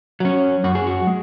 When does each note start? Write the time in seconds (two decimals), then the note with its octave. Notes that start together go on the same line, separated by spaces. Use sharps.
0.20 F#3 C#4
0.64 F#2 F#4
0.75 G#4
0.87 F#4
1.07 G#3